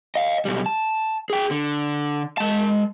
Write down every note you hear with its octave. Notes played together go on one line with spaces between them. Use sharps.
D#5 F5
B1 G3
A5
G#4 G5
D3
G#3 A5